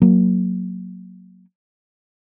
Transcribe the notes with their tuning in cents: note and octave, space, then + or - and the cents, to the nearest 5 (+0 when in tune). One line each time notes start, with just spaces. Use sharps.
F#3 -5 A#3 +0